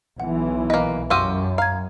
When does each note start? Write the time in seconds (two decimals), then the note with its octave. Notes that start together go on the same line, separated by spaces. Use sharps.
0.20 B1 E3 F#5
0.70 A#3 B4 D#5
1.10 F#2 F#4 G4 F5 C6 E6 D#7
1.58 F5 A#5 G#6